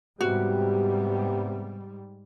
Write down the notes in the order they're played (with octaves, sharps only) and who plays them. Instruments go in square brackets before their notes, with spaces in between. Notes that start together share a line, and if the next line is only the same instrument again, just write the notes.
[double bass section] G#2 G3 [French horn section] C3 B3 G4 [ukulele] F#4